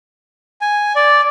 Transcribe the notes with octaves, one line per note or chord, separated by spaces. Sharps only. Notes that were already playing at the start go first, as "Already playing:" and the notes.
G#5
D5